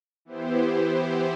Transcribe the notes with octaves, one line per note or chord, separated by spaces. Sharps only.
E3 B3 E4 G4 C5